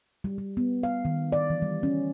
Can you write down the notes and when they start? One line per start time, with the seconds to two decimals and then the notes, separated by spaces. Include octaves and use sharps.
0.24 G3
0.38 G3
0.57 B3
0.83 F5
1.05 D#3
1.32 D5
1.50 E3
1.62 G3
1.83 C#4